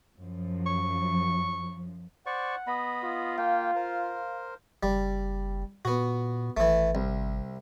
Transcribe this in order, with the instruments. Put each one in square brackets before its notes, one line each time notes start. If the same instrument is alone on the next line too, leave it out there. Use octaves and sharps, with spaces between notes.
[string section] F#2 F3
[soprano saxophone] C#6
[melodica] C5 D5 C#6 [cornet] F#5
[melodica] B3 D#5 B5
[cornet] F4
[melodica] A#3 G5 [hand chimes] F5
[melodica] A#4 C5
[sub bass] F#1 [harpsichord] G3
[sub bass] A#2 [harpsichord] B3 F#4
[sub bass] G#1 [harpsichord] E3 A3
[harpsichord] C2